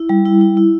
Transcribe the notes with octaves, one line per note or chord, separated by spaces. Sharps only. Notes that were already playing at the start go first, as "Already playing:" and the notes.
Already playing: E4
G3
E4
E4
E4